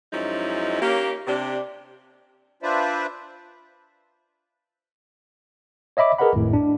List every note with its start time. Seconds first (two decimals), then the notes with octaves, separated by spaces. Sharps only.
0.12 F#2 F3 G#3 C#4 D#4 E4
0.81 A#3 C#4 G4
1.27 C3 D4 G4
2.63 D4 F4 B4 C5 D5 E5
5.97 C#5 D#5 E5 B5 D6
6.18 G#4 A#4 B4 D#5 F#5 B5
6.33 G#1 F2 A2
6.53 D4